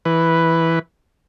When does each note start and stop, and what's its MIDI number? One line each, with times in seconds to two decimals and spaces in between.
0.05 0.79 52
0.05 0.79 71